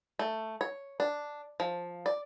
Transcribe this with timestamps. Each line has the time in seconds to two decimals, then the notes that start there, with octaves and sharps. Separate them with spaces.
0.19 A3
0.61 C#5
1.00 D4
1.60 F3
2.06 D5